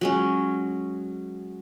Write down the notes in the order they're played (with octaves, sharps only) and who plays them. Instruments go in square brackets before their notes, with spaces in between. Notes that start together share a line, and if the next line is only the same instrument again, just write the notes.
[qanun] F#3 G#3 C#4